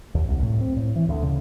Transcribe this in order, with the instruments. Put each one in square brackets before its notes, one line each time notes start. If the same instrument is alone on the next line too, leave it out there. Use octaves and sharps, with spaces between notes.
[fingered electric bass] D#2
C2
A2
C4
A2
E3
D2
C#3